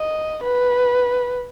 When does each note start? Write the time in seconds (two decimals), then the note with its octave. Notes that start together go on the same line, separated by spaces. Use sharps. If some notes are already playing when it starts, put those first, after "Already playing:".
Already playing: D#5
0.44 B4